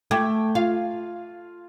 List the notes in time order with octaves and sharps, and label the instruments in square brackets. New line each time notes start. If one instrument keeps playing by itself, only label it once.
[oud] A3 [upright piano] G5 D6 G#6
[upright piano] F4 [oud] F5